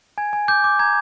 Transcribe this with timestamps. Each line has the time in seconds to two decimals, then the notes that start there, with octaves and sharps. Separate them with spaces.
0.18 G#5 G#6
0.33 G#5
0.48 D6 G6
0.64 D6
0.79 A#5 G#6